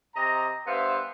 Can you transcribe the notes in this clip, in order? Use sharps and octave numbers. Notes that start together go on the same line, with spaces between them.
C3 D#5 A#5
G2 B3 C5 E5 F5